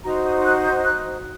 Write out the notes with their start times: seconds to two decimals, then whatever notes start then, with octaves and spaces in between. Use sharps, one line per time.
0.04 D#4 F#4 C5 A#5
0.24 D#6
0.44 F#6
0.64 G6
0.83 F#6